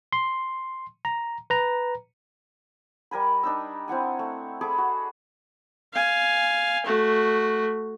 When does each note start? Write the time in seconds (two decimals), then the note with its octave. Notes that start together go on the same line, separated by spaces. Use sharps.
0.13 C6
1.05 A#5
1.50 B4 A#5
3.11 G3 A#4 G#5 B5
3.43 D4 D#4 E6
3.88 C4 E4 F#5 G#5
4.19 A3
4.61 G#4 A4 B5 D6
4.78 F#4
5.93 F5 G#5
6.86 A3 F#4